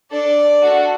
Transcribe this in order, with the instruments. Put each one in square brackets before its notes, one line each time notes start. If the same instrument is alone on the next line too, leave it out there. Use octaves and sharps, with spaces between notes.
[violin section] D4 A4 D5
A3 D4 F#4 A4